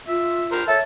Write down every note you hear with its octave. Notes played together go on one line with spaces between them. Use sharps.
F4 E5
A#4 C5
A4 C#5 E5 A5